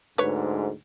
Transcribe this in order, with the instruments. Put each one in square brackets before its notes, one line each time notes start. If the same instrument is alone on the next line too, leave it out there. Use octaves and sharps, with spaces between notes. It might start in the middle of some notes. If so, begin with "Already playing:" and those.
[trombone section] D2 G#2 [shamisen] B4 C#5